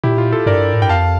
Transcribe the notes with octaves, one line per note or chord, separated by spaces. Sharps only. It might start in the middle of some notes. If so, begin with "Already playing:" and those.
A#2 E4 G4
F4
F4 A4
G2 A#4 D5
A2
G2 G5
F2 F5 A5